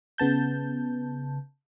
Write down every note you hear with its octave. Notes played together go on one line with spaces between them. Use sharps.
C#3 B3 A5 G6